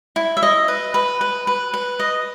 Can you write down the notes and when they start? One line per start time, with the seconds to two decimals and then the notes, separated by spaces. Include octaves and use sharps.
0.16 E4
0.37 E5
0.43 D#5
0.68 B4
0.94 B4
1.21 B4
1.47 B4
1.74 B4
2.00 D#5